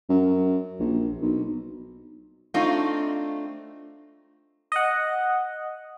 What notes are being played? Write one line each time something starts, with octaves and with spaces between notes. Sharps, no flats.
F#2
A#1
B1
A3 C4 D4 D#4 F4
D#5 F#5